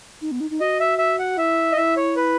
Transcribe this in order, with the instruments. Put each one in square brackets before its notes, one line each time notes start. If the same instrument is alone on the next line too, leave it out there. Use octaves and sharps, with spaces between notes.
[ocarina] D#4
B3
D#4
D#4
[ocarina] F#4 [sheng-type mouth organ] D#5
[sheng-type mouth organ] E5
E5
F#5
[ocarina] E4 [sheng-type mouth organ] E5
[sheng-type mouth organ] D#5
[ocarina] E4 [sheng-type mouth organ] E5
[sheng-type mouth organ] C#5
B4